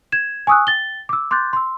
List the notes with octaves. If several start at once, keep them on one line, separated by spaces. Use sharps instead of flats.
G#6 E7
G#5 C#6 D#6 E6 F#6
G5 A6 G7
D6 E6
C6 D6 F#6 G6 A6
C6 E6